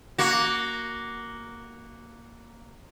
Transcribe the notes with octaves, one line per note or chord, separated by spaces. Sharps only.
A#3 F#4